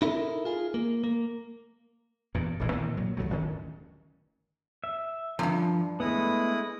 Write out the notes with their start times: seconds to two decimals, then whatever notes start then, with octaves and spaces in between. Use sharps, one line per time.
0.02 D#4 E4 A4 A#4
0.45 F4 G#4
0.74 A#3
1.04 A#3
2.34 E2 G2 A#2
2.59 D#1 A1 A#2
2.72 A#2 D#3 E3
2.97 A#2 F#3
3.17 C#2 F#3 A3
3.29 D1 G1 D#3 C#4
4.84 E5
5.39 E2 G2 F3
6.00 G#3 A3 B3 E4 D#6